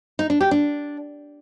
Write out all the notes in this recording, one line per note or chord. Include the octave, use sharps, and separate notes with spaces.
D#4
D4
G4
D4